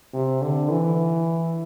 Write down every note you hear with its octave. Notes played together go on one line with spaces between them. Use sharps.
C3
D3
E3